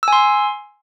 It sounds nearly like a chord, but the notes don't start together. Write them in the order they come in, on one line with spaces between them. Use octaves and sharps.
E6 G#5 C6